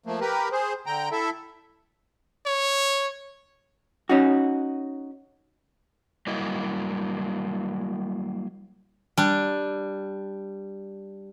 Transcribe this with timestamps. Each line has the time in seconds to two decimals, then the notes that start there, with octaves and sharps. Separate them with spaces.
0.06 F3 A3 A#3
0.21 G4 A#4 B4
0.52 G#4 C5
0.86 D3 G5 A#5
1.12 E4 A4 E5
2.46 C#5
4.09 C#4 D#4 F#4
6.27 F#3 G3 A#3 E4 D#5
9.17 G3 D4